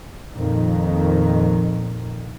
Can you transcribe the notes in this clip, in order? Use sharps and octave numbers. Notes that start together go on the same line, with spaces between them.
F2 A#2 D#3